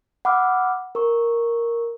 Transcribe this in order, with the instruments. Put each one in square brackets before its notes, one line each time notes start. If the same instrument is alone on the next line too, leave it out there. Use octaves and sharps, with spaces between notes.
[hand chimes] F#5 B5 D6 E6 F6
A#4 C#6